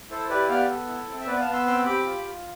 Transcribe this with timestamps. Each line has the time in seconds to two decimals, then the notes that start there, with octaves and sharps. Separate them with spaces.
0.10 E4 A4 C5
0.29 G4 B4 D5
0.49 B3 D5 F5
0.69 A4
0.88 E4
1.08 C4
1.21 E5
1.27 B3 B4 D5
1.40 F5 A5
1.47 B3
1.53 C6 E6
1.66 C4 C6 E6
1.85 G4 B5 D6
2.05 F4
2.24 F4